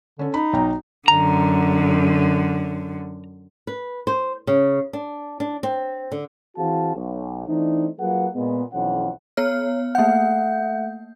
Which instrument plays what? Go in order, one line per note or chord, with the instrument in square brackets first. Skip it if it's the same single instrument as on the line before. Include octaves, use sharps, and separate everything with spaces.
[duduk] D3 [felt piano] C#4 A4
[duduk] D#4 [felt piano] B5
[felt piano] B1 G5 A#5
[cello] F#2 D3 [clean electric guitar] A#5
[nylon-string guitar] B4
C5
C#3
D4
D4
C4
D3
[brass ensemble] E3 C4 F#4 G#4 F5 A5
B1
E3 A3 C4 D4 D#4
F#3 A#3 F4 G#4 B4 F#5
A#2 G#3 B3
B1 F2 E3 C#4 F#5
[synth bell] B3 C#5 F6
[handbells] A3 F#5 [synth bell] A#3 G6